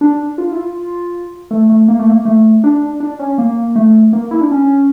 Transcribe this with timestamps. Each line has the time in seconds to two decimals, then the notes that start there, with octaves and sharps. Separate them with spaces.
0.01 D4
0.38 F4
0.52 E4
0.57 F4
1.51 A3
1.69 A3
1.88 A#3
1.99 A3
2.09 A#3
2.25 A3
2.64 D4
3.00 D4
3.19 C#4
3.38 A#3
3.76 A3
4.13 A#3
4.31 E4
4.41 D4
4.51 C#4